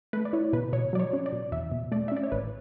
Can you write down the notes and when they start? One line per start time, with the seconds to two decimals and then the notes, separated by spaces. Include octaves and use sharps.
0.13 A3 B4
0.25 D5
0.33 E4 C#5
0.53 B2 B4
0.73 B2 C#5
0.93 F#3 D5
1.00 C#5
1.13 C#4 C#5
1.26 D5
1.32 B2
1.52 E2 E5
1.72 B2
1.92 A3 D5
2.08 E5
2.12 C#4 D5
2.23 C#5
2.32 A1 B4